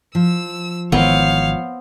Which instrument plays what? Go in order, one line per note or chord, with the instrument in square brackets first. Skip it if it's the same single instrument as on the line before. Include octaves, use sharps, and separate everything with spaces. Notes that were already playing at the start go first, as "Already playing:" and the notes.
[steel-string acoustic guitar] F3 [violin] E6
[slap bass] G#1 D#3 E3 [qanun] B3 C4 [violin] C#5 F5